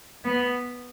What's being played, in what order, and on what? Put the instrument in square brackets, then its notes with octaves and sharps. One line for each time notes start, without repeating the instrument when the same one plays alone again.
[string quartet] B3